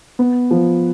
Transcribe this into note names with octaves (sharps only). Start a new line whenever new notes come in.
B3
F3